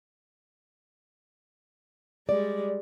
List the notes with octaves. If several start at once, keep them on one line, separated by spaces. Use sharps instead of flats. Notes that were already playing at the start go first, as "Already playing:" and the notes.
G3 G#3 D5